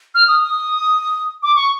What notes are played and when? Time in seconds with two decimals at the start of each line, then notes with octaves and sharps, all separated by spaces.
0.15 F6
0.28 D#6
0.41 D#6
1.43 D6
1.56 C#6